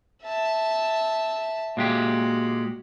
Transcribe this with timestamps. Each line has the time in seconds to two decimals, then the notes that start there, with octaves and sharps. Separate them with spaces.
0.23 E5 A5
1.77 A#2 G#3 F#4 G4